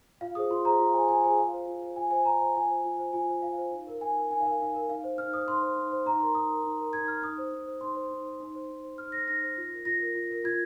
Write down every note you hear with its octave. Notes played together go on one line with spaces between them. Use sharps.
F4 F5
G#4 C5 D#6
F4 C6
G#4 C5 A#5
F4 F5
G#4 C5 G#5
F4 G#5
G#4 C5 G#5
F4 F5
C5
F4
C5
F4 G#5
C5 G#5
F4 A#5
C5 A#5
F4 G#5
C5
F4
C5
F4 G#5
C5
F4 F5
C5
D#4
A#4
D#4 G#5
A#4
D#4 G#5
A#4 F5
D#4 F5
A#4
D#4 F5
C5
D#4 F6
C5 D#6
D#4 C6
C5
D#4
C5
D#4 A#5
A#4 C6
D#4 D#6
A#4
D#4
A#4
D#4 G#6
A#4 F6
D#4 D#6
C5
D#4
C5
D#4 C6
C5
D#4
C5
D#4
C5
D#4
C5
D#4 F6
C5 A#6
D#4 A#6
C5
F4
A#4
F4 A#6
A#4
F4
A#4
F4 G#6